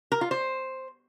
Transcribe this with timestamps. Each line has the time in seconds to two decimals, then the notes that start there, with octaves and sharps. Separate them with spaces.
0.12 A#4
0.21 F4
0.31 C5